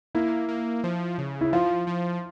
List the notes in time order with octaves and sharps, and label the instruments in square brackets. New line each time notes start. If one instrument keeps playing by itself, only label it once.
[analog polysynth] A#3 [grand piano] E4
[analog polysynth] A#3
F3
C#3
[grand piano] E4
[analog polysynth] F3 [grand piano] F4
[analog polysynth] F3